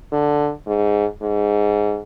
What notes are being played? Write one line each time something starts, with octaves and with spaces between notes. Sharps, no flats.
D3
G#2
G#2